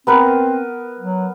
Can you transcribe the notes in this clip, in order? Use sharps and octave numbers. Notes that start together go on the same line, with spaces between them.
B3 C4 A#4 B4
F#3